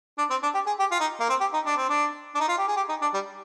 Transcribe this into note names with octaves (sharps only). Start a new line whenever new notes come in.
D4
C4
D4
G4
G#4
G4
F4
D#4
A#3
C4
G4
D#4
D4
C4
D4
D4
D#4
F4
G4
G#4
G4
D#4
D4
G3